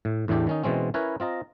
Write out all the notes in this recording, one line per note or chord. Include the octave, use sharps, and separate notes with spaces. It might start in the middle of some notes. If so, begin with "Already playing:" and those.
A2
E2 A2 E3 D4 G4
D#3 C#4 D#4
B2 E3 G#3 C4 C#4
C#4 E4 A#4 B4 C#5
C4 F4 D#5 A#5